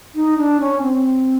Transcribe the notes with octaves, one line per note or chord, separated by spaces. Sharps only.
D#4
D4
C#4
C4